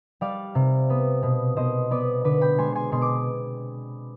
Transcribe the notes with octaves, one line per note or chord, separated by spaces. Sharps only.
G3 D5 F5
C3
B3
B2
B2 C5 D#5
B3 B4 D5
D3 B4 D5
G5 B5
G#3 G#5 C6
G#5 C6
B2 C6
D6